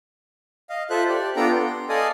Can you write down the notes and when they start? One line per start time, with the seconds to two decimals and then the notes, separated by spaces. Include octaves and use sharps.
0.70 D#5 F5
0.90 F4 A4 C5 E5 F#6
1.09 G4 D5
1.36 B3 D4 F4 A4 G5 A#5
1.52 C6
1.89 A4 D5 D#5 F5 G#5 D#6